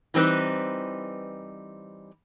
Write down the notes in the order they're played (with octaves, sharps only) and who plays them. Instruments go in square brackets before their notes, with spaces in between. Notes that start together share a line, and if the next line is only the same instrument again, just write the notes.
[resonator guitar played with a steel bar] E3 G3 C4 D#4 B4